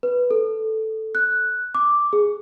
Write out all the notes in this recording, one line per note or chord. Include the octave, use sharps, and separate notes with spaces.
B4
A4
F#6
D6
G#4